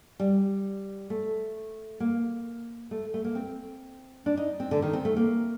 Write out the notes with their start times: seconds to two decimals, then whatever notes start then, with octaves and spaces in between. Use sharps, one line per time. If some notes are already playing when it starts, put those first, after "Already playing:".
0.20 G3
1.10 A3
2.00 A#3
2.91 A3
3.14 A3
3.25 A#3
3.35 C4
4.26 D4
4.37 D#4
4.60 C4
4.71 D3
4.82 D#3
4.93 C4
5.05 A3
5.17 A#3